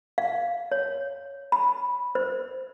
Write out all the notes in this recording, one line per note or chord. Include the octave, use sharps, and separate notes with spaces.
F5
C#5
B5
C5